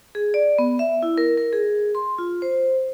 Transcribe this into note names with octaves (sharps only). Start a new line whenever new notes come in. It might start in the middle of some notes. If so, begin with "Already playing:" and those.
G#4
D5
B3
E5
E4
A#4
A#4
G#4
C6
F4
C5